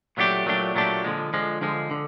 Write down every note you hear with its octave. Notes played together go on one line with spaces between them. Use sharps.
A#2 F#3 A3 D4 G4
A#2 F#3 A3 D4 G4
A#2 F#3 A3 D4 G4
D3 F3 G#3
D3 F3 G#3
D3 F3 G#3
D3